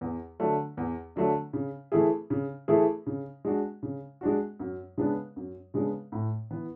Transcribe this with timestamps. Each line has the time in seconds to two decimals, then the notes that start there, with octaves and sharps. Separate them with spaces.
0.01 E2
0.40 D3 F#3 A3 D4
0.77 E2
1.16 D3 F#3 A3 D4
1.53 C#3
1.92 E3 A3 E4 G#4
2.30 C#3
2.68 E3 A3 E4 G#4
3.06 C#3
3.45 G#3 D4 F#4
3.83 C#3
4.21 G#3 D4 F#4
4.60 F#2
4.98 C#3 G#3 B3 D4
5.36 F#2
5.74 C#3 G#3 B3 D4
6.12 A2
6.51 E3 B3